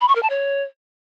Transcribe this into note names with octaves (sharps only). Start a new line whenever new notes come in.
B5
C#6
A#4
A5
C#5